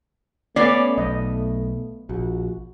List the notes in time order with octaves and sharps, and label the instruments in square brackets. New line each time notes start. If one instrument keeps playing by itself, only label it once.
[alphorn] A3 [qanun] B3 F5 [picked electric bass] C#4 [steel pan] D5
[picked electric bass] B1 [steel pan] D#5
[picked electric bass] A#1 [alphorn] F#4